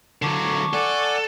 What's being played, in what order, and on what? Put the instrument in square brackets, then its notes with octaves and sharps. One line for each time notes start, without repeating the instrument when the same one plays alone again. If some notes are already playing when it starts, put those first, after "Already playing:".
[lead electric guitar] D3 F#3 [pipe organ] A5 C#6 D6
[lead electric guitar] A4 [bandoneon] D5 F#5 G#5